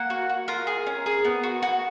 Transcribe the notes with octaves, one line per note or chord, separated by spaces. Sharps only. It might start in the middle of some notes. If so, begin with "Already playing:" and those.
Already playing: A#3 F#5
F#4
F#4
F4 A#4
G#4
C#4
G#4
B3
F#4
F#4